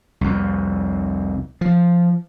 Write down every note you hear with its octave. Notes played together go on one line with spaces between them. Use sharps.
C2 F2
F3